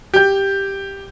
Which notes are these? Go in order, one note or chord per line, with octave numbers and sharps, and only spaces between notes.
G4 G6